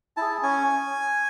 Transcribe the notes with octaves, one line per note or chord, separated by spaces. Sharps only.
E4 G#4 A5
C#4 G#5